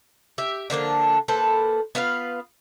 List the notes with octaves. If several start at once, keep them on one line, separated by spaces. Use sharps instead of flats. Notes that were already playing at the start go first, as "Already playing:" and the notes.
G4 E5
D3 F3 A#3 D4
A#3 A4 B4 C5
B3 F4 B4 F5